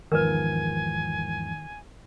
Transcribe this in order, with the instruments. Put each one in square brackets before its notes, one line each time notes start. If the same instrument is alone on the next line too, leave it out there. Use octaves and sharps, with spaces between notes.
[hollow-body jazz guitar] E2 G#2 F3 [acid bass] D#3 [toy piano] A#4 B4 [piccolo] G#5